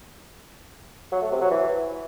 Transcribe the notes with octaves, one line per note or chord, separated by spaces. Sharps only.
F#3
A3
C3
F#3
E3